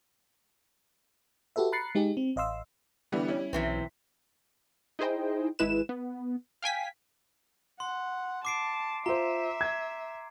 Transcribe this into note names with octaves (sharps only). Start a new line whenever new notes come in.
F#4 G4 A4 B4 E5
A#5 B5 F#6 A6 C7 C#7
G#3 D#4 G4 G#4
C4
A1 D#5 F5 C6 E6
D3 E3 G3 B3
C#4 E4
B1 C3 E3 C4
D#4 E4 G#4 C5 D#5 G5
G#1 G#3 E4 B4 E7
B3
F5 G5 G#5 B6
F#5 C6
A5 D6 C7 D7
F4 C5 E5 A#5
G#6